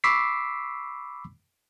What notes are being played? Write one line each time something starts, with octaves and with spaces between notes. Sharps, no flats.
B5 C#6 D6 E6 B6 C7